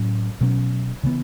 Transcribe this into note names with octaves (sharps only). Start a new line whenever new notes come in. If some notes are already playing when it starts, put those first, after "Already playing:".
Already playing: A2 F#3 C#4
B2 F#3 C#4
C#3 E3 B3